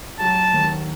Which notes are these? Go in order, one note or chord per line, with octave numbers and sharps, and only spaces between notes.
F#3 A5
D#2